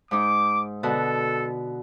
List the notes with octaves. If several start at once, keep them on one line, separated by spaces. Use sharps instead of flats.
G#2 D#4 D6
B2 D3 F#4 A4